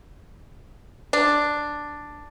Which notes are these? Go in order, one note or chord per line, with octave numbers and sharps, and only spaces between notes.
D4